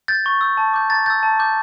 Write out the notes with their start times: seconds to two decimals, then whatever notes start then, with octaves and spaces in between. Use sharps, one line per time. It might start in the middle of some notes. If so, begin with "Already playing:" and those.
0.08 G6 A6
0.26 C#6
0.41 E6 G6
0.57 A5
0.74 D6 G6
0.90 A#5 A6
1.06 E6 G6 A6
1.23 A5
1.39 D6 G6